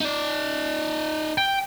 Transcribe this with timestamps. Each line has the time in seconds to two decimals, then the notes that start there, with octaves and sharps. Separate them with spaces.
0.01 D#4 D5
1.38 G5